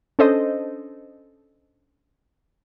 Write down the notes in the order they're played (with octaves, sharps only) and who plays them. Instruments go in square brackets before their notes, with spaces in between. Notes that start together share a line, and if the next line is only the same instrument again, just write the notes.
[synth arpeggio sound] C#4 D4 A4 C5 D#5